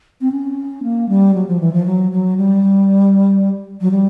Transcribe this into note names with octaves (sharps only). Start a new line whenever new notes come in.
C4
C#4
A#3
G3
F#3
F3
E3
F3
F#3
F#3
G3
F#3
G3